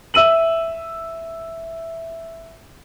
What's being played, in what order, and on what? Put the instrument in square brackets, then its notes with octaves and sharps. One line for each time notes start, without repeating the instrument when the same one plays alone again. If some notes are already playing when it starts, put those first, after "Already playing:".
[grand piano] E5 E6 D#7 F#7